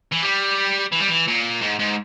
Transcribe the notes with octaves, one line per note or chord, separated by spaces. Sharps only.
E3
G3
E3
G3
E3
A#2
G#2
G#2